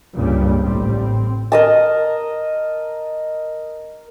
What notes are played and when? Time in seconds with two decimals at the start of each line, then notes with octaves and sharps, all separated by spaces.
0.15 C#2 G2 A#2 C#3 G3
0.61 A1 A2 G3 C4
0.96 A2 C4
1.52 A#4 D#5 A5